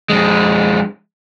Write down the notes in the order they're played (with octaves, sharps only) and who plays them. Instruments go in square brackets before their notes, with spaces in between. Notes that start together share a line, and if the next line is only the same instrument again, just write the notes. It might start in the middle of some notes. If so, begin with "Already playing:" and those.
[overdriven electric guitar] F2 G#3